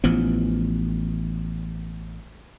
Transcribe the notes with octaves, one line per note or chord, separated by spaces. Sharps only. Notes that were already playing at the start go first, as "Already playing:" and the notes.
A1 E3 F3 B3